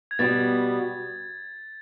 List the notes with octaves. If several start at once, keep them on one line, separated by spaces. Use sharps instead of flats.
G#6
B2 G3 B3 A6